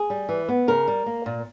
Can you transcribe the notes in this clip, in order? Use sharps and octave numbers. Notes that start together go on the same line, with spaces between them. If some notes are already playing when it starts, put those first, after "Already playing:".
Already playing: G#4
G3
E3
B3
C#3 A#4
G3
A#3
A#2